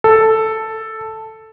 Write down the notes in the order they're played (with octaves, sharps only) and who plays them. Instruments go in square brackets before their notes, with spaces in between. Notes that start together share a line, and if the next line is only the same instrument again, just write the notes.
[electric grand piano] A4